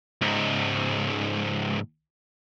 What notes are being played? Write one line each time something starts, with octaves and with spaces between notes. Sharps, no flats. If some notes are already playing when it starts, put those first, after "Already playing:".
C#2 G#2